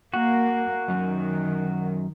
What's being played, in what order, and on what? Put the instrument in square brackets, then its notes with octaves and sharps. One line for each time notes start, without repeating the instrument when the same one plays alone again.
[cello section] A#3 [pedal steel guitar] F#4
[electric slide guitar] F#2 F#3 [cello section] D#3